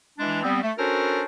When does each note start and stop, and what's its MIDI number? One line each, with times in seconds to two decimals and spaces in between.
0.19 0.41 52
0.19 0.41 56
0.19 0.41 62
0.43 0.60 55
0.43 0.60 59
0.43 0.60 60
0.61 0.71 57
0.77 1.24 61
0.77 1.24 62
0.77 1.24 66
0.77 1.24 69
0.77 1.24 70
0.77 1.24 72